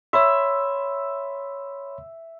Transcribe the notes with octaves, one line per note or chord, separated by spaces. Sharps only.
C#5 E5 B5 C6